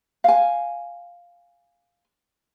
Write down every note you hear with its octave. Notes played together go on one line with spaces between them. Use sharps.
F5 G#5